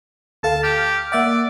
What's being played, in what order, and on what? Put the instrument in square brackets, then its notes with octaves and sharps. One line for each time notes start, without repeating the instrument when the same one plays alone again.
[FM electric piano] D2 A4 F5 [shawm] A5
[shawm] G4 [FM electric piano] F6
[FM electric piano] A#3 E5 F#5 [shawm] D5